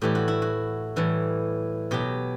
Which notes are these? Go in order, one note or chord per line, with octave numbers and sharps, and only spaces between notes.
A2 E3 G3 G4
F#4
E4
F#4
A2 E3 G3
B2 F#3 G4